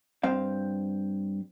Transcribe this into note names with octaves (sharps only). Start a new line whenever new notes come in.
G2 C4 F5